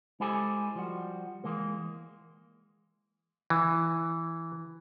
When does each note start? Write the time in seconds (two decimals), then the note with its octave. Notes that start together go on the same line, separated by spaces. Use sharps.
0.20 G#3 E4 G4 A4 C5 G#5
0.75 F3 G3 F#4
1.44 E3 G#3 A#3
3.50 E3